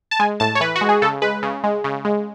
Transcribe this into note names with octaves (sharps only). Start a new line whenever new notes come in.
A5
G#3 G#5
A2 A5
C#5
E3 B4
F#4
G#3
G#4
C#3 A4
G#3 B4
C#3
G#3
C#3
G#3